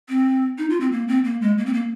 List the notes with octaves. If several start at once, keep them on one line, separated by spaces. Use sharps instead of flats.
C4
D#4
F4
C4
A#3
C4
A#3
G#3
A#3
C4
A#3